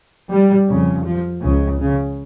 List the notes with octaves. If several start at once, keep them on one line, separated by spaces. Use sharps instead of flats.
G3
F2 C#3
F3
C#2 C#3
C#3